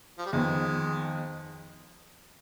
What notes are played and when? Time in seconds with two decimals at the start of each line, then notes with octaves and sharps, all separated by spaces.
0.18 F3
0.25 G3
0.32 F2 D#3 G#3 B3